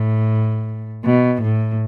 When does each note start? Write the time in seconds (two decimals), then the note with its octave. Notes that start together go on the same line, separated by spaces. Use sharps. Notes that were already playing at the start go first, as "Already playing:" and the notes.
Already playing: A2
1.05 B2
1.42 A2